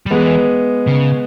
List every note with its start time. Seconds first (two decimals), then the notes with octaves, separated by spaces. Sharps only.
0.06 G3
0.11 E3 G#3 B3
0.87 C#3